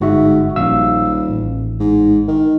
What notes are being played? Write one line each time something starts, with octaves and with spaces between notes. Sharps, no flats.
G1 G#2 F#4 E5
D#1 A#1 F5 E6
A1
G#2
D#3